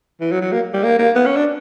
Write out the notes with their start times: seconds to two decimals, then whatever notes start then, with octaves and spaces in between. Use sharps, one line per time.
0.21 E3
0.31 F#3
0.41 F#3
0.52 A#3
0.73 G3
0.84 A#3
0.99 A#3
1.15 B3
1.26 C#4
1.36 D4